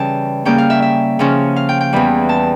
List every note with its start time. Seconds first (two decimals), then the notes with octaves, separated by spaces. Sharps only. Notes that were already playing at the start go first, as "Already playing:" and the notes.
Already playing: C#3 E3 G3 C#4 G5 A5
0.45 C#3 G3 A#3 C#4 G5
0.58 F5
0.70 E5
0.82 E5
1.19 C#3 F3 C#4
1.56 F5
1.69 G5
1.81 G5
1.93 E2 E3 G3
2.29 A5